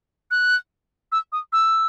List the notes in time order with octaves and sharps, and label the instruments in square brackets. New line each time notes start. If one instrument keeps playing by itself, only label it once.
[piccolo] F#6
E6
D#6
E6